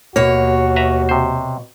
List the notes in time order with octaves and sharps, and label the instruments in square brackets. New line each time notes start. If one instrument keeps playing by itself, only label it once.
[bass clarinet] D#2 [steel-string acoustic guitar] B2 C#5 [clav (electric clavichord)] A#3 [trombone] F#4
[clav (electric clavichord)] B4 E5 A#5
C3 C5